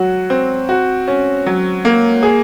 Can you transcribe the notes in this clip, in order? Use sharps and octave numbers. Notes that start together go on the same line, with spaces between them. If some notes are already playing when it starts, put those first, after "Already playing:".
Already playing: F#3 F#4
C4
F#4
C#4
F#3
A#3
G#4